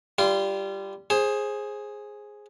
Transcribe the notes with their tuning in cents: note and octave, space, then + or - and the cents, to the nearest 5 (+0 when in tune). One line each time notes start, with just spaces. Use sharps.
G3 +0 F4 -30 C6 +0
G#4 +0 C5 +25